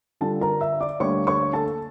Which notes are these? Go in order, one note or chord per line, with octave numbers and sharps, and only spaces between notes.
D3 G3 D4 F4 A4 A5
A#4 A#5
E5 E6
D5 D6
D2 D3 G3 A#3 C#5 C#6
C#5 C#6
A4 A5